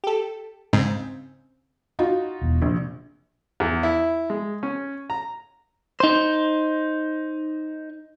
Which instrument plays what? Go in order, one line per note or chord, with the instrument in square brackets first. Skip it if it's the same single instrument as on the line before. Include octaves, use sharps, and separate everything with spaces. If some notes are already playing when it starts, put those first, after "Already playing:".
[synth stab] G4 A4
[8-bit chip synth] G#2 [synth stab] C#3 C4
[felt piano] D#4 F4 F#4
[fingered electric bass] E1 E2
[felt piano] A#1 [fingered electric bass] C3
[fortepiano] E2
E4
G#3
C#4
A#5
[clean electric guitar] D#4 C5